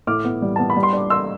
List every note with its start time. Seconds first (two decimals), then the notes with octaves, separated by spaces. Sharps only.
0.07 A2 D6 F6
0.25 B3
0.42 G3
0.56 B3 A5
0.70 B5
0.77 G3
0.83 C6
0.93 D4 D6
1.10 D4 C6 E6